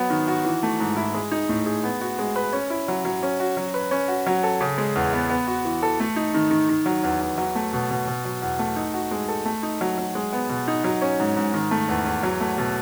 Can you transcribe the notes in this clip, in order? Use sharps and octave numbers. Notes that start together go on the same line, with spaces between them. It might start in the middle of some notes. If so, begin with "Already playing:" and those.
Already playing: F#3 B3
D#3
F#4
E3
A3
G#2
E4
G#3
D#4
A2
G#4
B3
F#4
G#3
B4
C#4
E4
F#3
F#3
C#4
F#4
F#3
B4
C#4
F#4
F#3
A4
C#3
G#3
E2
B3
B3
F#4
E3
A4
A3
D#4
D#3
D#3
D#3
F#3
E2
E2
F#3
A3
B2
B2
B2
F#3
E2
A3
D#4
F#4
G#3
A4
A3
D#4
F#3
F#3
G#3
B3
B2
D#4
F#3
C#4
G#2
G#2
D#3
A3
E2
E2
F#3
A3
B2